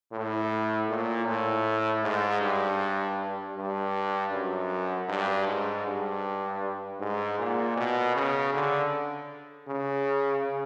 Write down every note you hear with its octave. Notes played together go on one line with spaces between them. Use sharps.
A2
A#2
A2
G#2
G2
G2
F#2
G2
G#2
G2
G#2
A#2
B2
C#3
D3
C#3